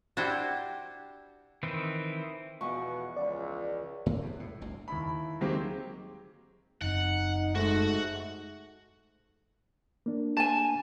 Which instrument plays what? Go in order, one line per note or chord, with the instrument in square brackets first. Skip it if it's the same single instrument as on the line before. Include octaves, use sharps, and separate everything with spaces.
[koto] D4 E4 F#4 G4 C5
[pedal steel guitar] D#3 E3 C4 E4
[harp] E2 E3 F3 [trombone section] B2 [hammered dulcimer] C#6
[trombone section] C#2 [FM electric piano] D5
[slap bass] G2 A#2 A#3
E2 B2
A2
G1 D2
[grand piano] D#2 E4 B5
D#3 F#3 G#3 A#3 C4 G4
[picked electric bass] F#1 F#2 C4 [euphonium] D#4 [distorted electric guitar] F#5
[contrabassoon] G#2 [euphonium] A3 [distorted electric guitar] F#4
[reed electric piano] A#3 D4
[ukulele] G#5 A5